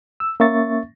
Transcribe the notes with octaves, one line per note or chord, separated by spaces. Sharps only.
E6
A#3 C#4 E5 C#6 A6